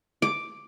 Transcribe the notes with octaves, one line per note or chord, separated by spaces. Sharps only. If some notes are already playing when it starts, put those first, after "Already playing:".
D6